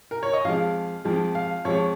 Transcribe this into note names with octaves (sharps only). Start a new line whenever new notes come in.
A#4
C#5
D#5
F2 F3 G#3 F5
F2 F3 G#3
F5
F2 F3 G#3 C#5